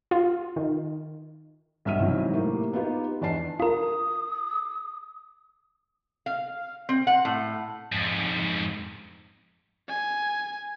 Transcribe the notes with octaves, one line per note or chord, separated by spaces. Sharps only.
F4
D#3
B1 G2 E5 F6 D#7
G#2 C3 E3 F#3
A2 A#3 G4
B3 D#4 F4 G4
E2 D4 D5 A5 C7
F4 A#4 D#6
F5
C4
F#5
A2
F2 G#2
G#5